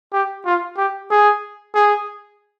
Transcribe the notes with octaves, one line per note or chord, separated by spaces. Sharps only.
G4
F4
G4
G#4
G#4